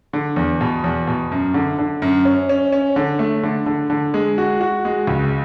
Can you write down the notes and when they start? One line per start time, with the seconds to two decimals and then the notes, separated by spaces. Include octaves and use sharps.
0.13 D3
0.36 E2
0.61 B2
0.84 E2
1.07 B2
1.31 F#2
1.54 D3
1.78 D3
2.02 F#2
2.25 C#4
2.49 C#4
2.72 C#4
2.96 D3
3.19 A3
3.43 D3
3.66 D3
3.90 D3
4.14 G#3
4.38 F#4
4.61 F#4
4.85 G#3
5.07 C#2